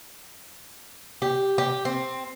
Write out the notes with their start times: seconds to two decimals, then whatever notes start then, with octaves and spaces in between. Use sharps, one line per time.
1.22 G4
1.58 G4
1.85 C4